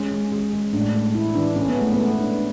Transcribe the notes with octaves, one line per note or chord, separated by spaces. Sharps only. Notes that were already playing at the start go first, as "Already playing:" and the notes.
Already playing: G#3 C#4
G#3
G#3
G#3
A2 D4
A3
A3 E4
E3 D4
C#4 A4
B3
G#3
A3
B3 A4
D4